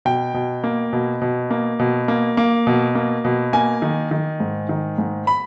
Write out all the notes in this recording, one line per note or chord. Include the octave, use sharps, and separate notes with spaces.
B2 G5
B2
A#3
B2
B2
A#3
B2
A#3
A#3
B2
A#3
B2
A#3 G#5
D#3
D#3
G#2
D#3
G#2
B5